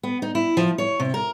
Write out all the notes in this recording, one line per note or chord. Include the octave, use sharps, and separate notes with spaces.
B3
D#4
E4
F3
C#5
C3
A#4